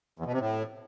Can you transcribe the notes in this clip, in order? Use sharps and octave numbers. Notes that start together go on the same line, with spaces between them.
E2
B2
C3
A2